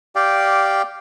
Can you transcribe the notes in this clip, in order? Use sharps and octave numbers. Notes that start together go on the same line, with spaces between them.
G4 D5 F5 G5